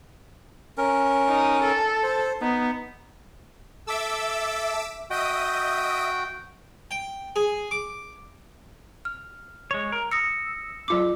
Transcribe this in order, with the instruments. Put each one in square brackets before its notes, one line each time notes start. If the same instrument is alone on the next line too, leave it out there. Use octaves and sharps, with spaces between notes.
[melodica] C#4 A#4
[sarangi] D#4
A4
[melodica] C5
[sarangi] B3 [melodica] D#4
[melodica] A4 [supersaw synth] E5 D6 E6
[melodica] F#4 G5 [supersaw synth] D#5 E5 D#6
[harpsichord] G5
G#4
D6
[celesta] F6
[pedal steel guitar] G#3 C#5
A#4
[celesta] D#6 A#6 C#7 [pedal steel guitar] E6
[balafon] F#3 F4 D6